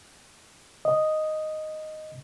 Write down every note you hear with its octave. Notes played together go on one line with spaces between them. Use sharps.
D#5